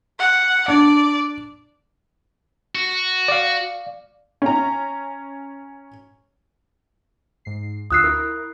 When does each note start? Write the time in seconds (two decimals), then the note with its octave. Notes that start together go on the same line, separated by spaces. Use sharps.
0.19 F#5
0.68 D4 D5
2.75 F#4
3.28 D5 F5
4.42 C#4 A#5
7.45 G#2 C7
7.91 D2 F4 D#6 E6 F#6 C7
8.04 E4 A#4